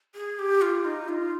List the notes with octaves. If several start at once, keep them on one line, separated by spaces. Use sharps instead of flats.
G#4
G4
F4
D#4
F4